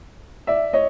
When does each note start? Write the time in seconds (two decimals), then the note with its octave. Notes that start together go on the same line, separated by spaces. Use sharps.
0.47 D5 E5
0.73 C#5 D#5